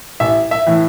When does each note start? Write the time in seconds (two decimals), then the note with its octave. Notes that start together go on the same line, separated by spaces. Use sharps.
0.20 A1 E5
0.51 E5
0.66 A2 E3